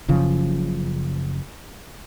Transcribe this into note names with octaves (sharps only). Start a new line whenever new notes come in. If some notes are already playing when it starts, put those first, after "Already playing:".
F#1 F#2 C#3 F3